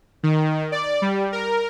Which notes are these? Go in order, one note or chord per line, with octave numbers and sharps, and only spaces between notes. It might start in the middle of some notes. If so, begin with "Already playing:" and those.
D#3
D5
G3
A#4